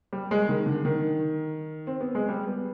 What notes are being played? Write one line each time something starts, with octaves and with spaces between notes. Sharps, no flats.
G3
G#3
D#3
D3
D#3
C4
B3
G#3
G3
B3